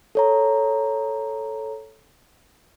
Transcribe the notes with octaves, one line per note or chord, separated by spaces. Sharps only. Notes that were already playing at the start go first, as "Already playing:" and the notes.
A4 C#5 A#5